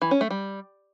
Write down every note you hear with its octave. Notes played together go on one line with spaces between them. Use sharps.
E3
C#4
A3
G3